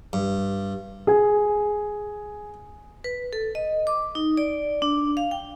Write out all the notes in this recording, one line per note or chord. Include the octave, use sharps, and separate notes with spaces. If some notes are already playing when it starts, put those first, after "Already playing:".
G2
G#4 G#5
B4
A4
D#5
D6
D#4
D5
D4
F5
G5